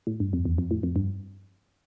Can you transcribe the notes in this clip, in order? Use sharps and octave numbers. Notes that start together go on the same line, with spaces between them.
A2
G2
F2
E2
F2
A2
F2
G2